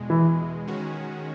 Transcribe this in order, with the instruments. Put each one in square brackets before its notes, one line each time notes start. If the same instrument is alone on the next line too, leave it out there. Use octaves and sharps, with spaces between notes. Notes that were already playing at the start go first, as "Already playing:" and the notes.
Already playing: [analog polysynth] E2 B2 G#3
[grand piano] E3
[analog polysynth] D#3 G#3 C#4 F#4